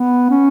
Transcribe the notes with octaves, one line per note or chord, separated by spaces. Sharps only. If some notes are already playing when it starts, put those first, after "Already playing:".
Already playing: B3
C#4